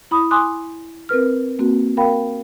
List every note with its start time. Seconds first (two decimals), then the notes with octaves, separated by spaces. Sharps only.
0.11 E4 B5 D#6
0.31 G#5 C6 D6 D#6 F#6
1.09 C4 A#4 B4 F6
1.59 A#3 C4 F#4
1.97 A#4 F5 G5 B5